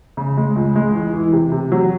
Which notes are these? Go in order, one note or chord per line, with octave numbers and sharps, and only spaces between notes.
C#3
G#3
C#2
G#3
E2
E3
C3
C3
F#3